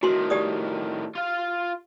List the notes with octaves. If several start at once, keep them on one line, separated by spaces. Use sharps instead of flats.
A2 D#3 F#4 C6
G4 D5 D#6
F4 F5